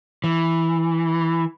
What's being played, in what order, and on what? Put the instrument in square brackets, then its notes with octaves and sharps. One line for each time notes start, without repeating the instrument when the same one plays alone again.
[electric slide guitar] E3